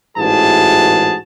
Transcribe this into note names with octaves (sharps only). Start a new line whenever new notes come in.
A1 G#2 E3 F#4 G#4 A5